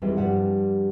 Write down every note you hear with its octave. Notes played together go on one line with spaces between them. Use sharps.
F2 E3 F3 G3 G#3 C4
G2 F3 G3 F#5